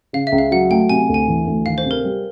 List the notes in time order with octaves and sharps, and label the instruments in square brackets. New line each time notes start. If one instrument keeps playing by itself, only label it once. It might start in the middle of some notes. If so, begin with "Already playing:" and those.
[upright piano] C#3 [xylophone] F5
[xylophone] E5
[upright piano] C#2
[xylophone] F5
[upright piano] F#3 [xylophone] F#5
[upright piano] A3 [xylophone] G5
[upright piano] C3 [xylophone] G#5
[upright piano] D2
[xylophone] G#5
[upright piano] E3
D2
[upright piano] D#3 [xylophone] F5
[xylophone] C5
[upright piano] C3
[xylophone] A#4
[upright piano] G3